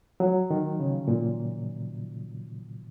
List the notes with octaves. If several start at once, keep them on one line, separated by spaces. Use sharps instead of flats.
F#3
D#3
C#3
A#2